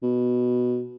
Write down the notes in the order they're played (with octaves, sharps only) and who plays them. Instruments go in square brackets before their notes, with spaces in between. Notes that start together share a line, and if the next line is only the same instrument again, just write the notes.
[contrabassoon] B2